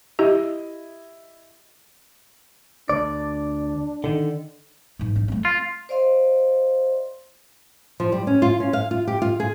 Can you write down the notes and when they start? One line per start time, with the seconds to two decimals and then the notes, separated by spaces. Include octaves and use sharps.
0.19 E4 G4 D#5
2.89 D2 D4 D5
4.04 D3 D#3
4.99 G#2 E3
5.16 D4
5.28 A3 C4
5.45 F4
5.89 C5 D5 D#5 F5 C6
8.00 F3
8.12 G3
8.27 C#4
8.42 F4
8.60 C#4
8.73 F5
8.91 F4
9.07 G4
9.22 F4
9.40 G#4